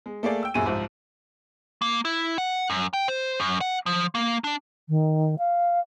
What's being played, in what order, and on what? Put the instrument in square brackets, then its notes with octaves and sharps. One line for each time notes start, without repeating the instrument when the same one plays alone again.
[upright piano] G#3
A3 A#3 G#4 D5
G5 E6
D#1 F#2 A#2 G#4 G#5 D#7
C2 G#2 F3
[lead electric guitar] A#3
E4
F#5
F#2
G5
C5
F#2
F#5
F3
A#3
D4
[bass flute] D#3
F5